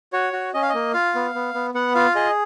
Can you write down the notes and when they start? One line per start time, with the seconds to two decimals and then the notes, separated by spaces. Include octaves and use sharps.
0.13 F#4 C#5
0.33 F#4
0.54 C#4 D#5
0.62 F5
0.69 D#5
0.74 A#3
0.94 F4 F5
1.15 B3
1.35 B3
1.54 B3
1.74 B3 F#5
1.95 F4 F5
2.15 G#4 D#5